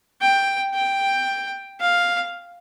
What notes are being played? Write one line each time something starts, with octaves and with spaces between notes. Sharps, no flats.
G5
G5
F5